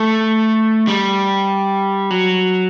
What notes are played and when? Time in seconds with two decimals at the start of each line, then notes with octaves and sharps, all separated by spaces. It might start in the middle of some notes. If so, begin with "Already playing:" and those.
Already playing: A3
0.87 G3
2.10 F#3